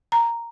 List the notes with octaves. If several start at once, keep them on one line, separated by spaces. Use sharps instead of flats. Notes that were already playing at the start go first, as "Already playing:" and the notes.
A#5